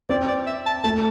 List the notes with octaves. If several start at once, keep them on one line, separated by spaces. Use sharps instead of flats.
C4 D5
D5
E5
A5
A3 A5